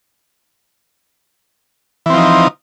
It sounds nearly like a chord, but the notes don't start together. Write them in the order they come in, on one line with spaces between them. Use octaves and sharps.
E3 C4 F3 D#4